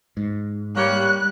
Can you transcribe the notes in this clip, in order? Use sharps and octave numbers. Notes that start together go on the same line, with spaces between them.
G#2
G3 A#3 G4 C#5 F#6